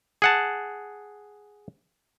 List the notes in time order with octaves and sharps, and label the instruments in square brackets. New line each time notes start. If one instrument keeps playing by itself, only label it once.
[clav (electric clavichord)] G#4 F#5 A5